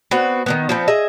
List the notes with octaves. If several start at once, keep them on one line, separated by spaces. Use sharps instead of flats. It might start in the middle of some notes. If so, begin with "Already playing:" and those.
B3 C4 F#4 F#5
D#3 G#3 B3
F3 B3 C4
G#4 D#5 E5